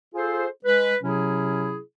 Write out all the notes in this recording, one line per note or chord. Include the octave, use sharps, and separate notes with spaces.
F4 G#4 A4 C5
G#3 B4
C3 F#3 C#4 E4 G#4